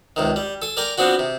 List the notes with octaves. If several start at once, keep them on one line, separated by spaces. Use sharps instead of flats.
C#2 C3 D#3
G3
A4 G#5
A#4 D5 G5 G#5 A#5
F3 B3 C4 D4 F#4
C3